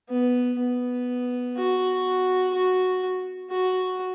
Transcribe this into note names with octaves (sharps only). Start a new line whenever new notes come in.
B3
B3
F#4
F#4
F#4